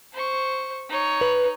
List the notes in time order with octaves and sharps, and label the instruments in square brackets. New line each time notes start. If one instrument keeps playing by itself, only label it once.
[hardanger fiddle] C5 C#6
D#4 C#5
[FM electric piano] B4